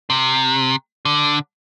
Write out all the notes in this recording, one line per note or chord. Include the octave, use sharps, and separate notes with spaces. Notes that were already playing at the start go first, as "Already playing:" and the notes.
C3
D3